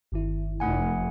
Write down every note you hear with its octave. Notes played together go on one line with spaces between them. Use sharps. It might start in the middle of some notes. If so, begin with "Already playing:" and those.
G1 D#3 E4
F1 A3 F#5 G#5